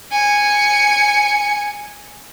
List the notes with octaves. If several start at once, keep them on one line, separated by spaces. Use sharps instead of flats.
G#5 C#7